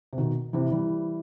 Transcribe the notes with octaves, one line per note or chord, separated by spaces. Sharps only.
C3
B2 D#3
C3 E3
E3 G3